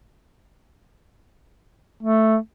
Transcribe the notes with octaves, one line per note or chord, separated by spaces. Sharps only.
A3